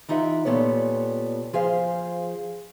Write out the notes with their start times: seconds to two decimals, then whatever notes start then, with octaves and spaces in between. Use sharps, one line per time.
0.09 E3 D#4 F4 G4 E5 F#5
0.45 A#2 G3 B3 A4 C#5
1.53 F3 G#4 C5 F5